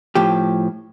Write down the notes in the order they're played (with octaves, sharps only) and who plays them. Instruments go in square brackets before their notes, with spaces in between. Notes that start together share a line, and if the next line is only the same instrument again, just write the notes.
[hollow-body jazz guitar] A2 F3 G4